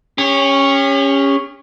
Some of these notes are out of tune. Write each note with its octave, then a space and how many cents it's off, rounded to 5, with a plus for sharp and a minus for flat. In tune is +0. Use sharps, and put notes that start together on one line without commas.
C#4 +0 G4 +45